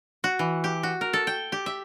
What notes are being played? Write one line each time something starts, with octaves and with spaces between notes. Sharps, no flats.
F#4
E3
G4
F#4
A#4
A4
G5
G4
E5